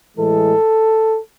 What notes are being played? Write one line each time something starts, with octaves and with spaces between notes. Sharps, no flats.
A2 E3 G#3 A4